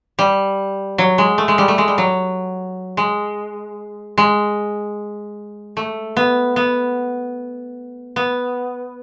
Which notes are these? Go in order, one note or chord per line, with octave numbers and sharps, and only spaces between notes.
G3
F#3
G#3
A3
G#3
G3
A3
G#3
G3
F#3
G#3
G#3
A3
B3
B3
B3